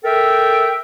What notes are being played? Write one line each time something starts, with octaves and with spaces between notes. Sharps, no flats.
A4 A#4 E5 G5